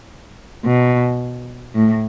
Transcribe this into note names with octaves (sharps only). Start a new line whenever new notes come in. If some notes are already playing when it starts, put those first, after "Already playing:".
B2
A2